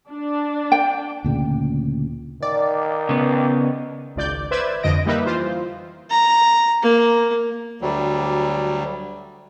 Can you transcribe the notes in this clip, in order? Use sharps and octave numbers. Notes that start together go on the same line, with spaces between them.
D4
G5
D2 A#2 C#3
D#3 D5
C#3 B3
G#1 C#2 D5 G6
B4 C5 D5 E5 G#6 E7
F2 D3 D#5 A#6 D7
G3 A#3 D#4 G4 B4 E5
E3 F4 C5
A#5
A#3
D2 F#3 G3